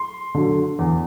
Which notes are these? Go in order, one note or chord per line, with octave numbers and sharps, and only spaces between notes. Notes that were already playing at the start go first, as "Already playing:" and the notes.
Already playing: C6
D3 F#3
E2